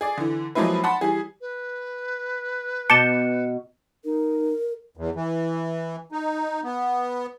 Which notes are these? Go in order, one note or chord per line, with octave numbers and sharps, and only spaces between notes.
G#4 D5
D3 E3
F3 F#3 G#3 A#3 E4 B4
F#5 A5 B5 C6
E3 G3 G#4
B4
B2 A5 D6 G6 C#7 E7
D#4 A#4
E2
E3
D#4
B3